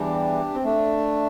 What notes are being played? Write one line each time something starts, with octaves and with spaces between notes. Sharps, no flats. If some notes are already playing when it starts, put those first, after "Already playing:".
Already playing: E2 E3 G3 D4 G4
C4
A3 D4